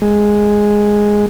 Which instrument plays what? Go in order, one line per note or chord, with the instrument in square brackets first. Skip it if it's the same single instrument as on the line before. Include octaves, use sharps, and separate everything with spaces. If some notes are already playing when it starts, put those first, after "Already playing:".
[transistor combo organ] G#3